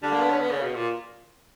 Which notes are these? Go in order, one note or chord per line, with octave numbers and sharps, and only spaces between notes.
D3 G3 D4
A#3
B3
C#4
B3
C#3
B2
A#2